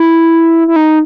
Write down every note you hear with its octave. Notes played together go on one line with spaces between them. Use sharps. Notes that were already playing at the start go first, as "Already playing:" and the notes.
Already playing: E4
E4
D#4